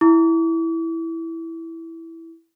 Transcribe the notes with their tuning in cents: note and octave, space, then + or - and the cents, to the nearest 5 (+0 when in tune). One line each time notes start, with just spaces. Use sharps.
E4 +0 D6 -45